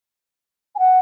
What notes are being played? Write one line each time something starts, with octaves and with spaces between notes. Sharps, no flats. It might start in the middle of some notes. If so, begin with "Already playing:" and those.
G#5
F#5